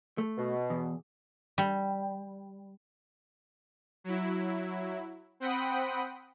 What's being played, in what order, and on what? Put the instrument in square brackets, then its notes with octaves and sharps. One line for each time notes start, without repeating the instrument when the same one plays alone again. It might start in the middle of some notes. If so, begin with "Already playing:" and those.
[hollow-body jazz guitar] A3
[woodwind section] B2
[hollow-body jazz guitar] E2
[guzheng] G3
[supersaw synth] F#3 E4
C4 F#5 G5 B5 D#6